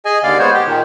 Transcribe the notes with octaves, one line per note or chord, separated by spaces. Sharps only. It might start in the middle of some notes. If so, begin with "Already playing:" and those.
G#4 D#5 G#5
D#2 D3 D5 F5
G#3 B3 C5 C#5
G4 G5
A#2 D#3